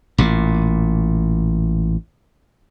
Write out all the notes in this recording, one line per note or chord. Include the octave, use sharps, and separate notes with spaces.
A1 A#2